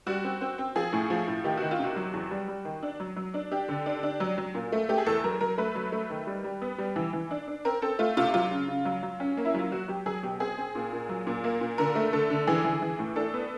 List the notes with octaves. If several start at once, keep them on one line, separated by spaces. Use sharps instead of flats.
G3 F#4
C4
C4
C4
F3 G#4
A2
F3
A2
D#3 G4
D#3 F#4
F4
C3 F#4
F#3
E2
G3
G3
D#3
D4
F#3
F#3
D4
D4 G4
D3
D4
D4
F#3
F#3
A#2
A3
A3 G4
G#4
E2 A4
F#3 A#4
F#3 A#4
A3 B4
F#3
A3
D#3
G3
G3
B3
G3
E3
E3
D4
D4
C4 A#4
C4 A4
A3 F4
C3 F4
F#3 F4
C#3
C#3
F#3
F#3
C#4
A#3
E4
F#3 F4
F#3 F#4
F#3 G4
F#3 G#4
B2 G4
C4 G#4
C4
A#2
A#2
F#3
A#2
A#3
A#2
D3 A#4
A3
D3 A4
D3
E3 G#4
E3
E3
A2
D4 A4
B3